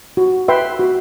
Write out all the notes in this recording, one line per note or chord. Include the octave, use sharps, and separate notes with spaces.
F#4
B4 E5 G5 C6
F#4